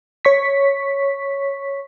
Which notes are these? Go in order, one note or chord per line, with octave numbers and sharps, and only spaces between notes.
C#5 C#6 B6